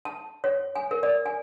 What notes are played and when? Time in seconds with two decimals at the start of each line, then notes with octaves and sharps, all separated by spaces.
0.05 A5
0.44 C#5
0.75 G#5
0.91 A#4
1.03 D5
1.26 G#5